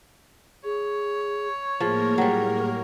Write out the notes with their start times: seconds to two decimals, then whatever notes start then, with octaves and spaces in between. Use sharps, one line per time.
0.64 G#4 C#5
1.80 A2 F3 A#3 G#4 A#4
2.18 F#3 G3